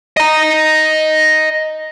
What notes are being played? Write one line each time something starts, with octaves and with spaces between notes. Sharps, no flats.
D#5 A#5